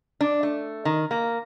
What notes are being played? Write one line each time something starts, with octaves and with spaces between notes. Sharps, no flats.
D4
A3
D#3
A#3